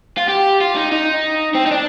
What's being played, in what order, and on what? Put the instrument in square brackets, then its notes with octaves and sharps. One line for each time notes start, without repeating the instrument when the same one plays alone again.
[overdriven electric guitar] F4
G4
F4
D#4
D#4
C4
D#4
D4